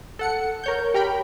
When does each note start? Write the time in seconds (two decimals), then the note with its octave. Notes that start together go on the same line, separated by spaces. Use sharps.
0.19 A4 F#5 C#7
0.64 A#4 C#5 G6
0.94 G4 A#4 G5 B5